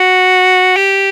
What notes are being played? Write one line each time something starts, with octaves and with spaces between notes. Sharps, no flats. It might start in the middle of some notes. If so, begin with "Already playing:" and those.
Already playing: F#4
G4